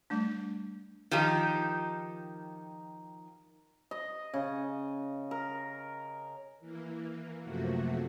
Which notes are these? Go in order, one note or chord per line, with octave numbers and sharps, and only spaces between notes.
G3 A3 D4
D#3 F3 D#4 G4
D#5
C#3
A#4
E3 A#3
F#2 C3 F3 A3 A#3 F#4